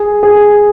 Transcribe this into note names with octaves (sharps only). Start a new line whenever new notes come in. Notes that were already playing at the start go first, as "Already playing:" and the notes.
Already playing: G#4
G#4